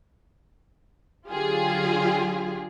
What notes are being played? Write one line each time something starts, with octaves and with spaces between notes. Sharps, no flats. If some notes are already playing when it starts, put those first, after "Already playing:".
D3 F#3 F4 G4 G#4